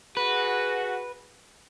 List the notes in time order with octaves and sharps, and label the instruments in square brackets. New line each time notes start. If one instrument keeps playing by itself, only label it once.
[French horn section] F#4 G#4 [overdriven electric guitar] B4